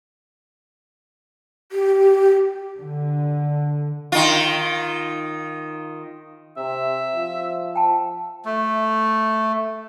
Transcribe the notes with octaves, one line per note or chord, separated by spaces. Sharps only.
G4
D3
D#3 F4
C3 E5
F3
G5 A5
A3